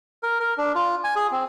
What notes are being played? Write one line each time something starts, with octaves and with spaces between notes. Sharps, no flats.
A#4
A#4
D4
F4
G#5
G#4
C4